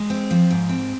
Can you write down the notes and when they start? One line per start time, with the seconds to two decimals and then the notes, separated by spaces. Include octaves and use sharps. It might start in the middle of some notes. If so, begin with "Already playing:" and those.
Already playing: G#3
0.10 C4
0.31 F3
0.50 G#2
0.69 C4